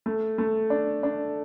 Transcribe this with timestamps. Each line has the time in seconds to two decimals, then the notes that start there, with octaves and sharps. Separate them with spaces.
0.06 A3
0.38 A3
0.70 D4
1.03 D4